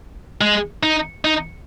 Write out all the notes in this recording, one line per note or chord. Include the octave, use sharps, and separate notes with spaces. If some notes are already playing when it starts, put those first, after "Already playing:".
G#3
D#4
D#4